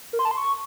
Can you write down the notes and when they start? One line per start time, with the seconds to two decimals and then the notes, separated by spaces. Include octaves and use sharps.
0.13 A#4
0.19 C6
0.25 A5
0.31 C6
0.37 C#6